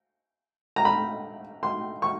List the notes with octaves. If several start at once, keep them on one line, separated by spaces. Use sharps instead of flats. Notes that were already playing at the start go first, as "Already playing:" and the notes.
A#5
B5
C6
C#6